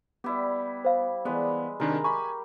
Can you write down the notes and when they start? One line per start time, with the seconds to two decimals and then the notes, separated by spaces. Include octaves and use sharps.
0.24 G3 B3 E4 G4
0.85 C5 F5
1.25 E3 G3 G#3 B3 B4
1.80 C3 D#3 G#3 D4 A#4
2.04 G4 G#5 B5 C#6